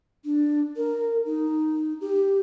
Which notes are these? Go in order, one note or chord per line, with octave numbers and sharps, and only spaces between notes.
D4
A#4
D#4
G4